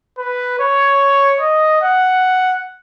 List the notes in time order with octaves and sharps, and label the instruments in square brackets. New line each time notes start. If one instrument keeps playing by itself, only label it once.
[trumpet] B4
C#5
D#5
F#5